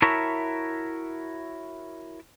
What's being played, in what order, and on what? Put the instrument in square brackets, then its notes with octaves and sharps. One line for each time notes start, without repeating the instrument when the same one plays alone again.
[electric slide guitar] E4 F#4 A#4 C#5 E5 A5